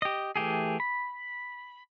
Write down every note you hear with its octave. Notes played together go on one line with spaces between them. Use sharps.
G4 D#5
E3 A3 G4 G#4
B5